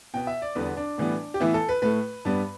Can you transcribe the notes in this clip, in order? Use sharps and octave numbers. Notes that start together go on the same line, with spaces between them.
B2 B3 G5
E5
D5
E2 D3 G3 B3 B4
D4
A2 E3 G3 B3
G4
A2 E3 B3 E4
A4
B4
A2 A3 B4
G2 G3 B3